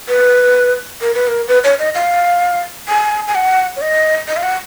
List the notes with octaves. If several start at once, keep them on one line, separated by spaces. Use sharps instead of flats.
B4
A#4
B4
A#4
B4
C#5
D#5
F5
G#5
G#5
F#5
C#5
D#5
D#5
F5
F#5